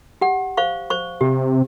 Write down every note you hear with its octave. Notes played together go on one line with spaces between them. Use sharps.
G4 F#5
C5 F5 C#6
C5 C#6
C3 G4